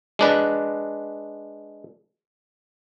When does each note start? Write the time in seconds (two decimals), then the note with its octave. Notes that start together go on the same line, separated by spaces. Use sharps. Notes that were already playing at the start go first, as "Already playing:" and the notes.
0.19 G#3 D4 B4